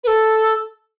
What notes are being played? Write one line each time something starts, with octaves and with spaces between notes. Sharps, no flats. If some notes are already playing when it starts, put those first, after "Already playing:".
B4
A4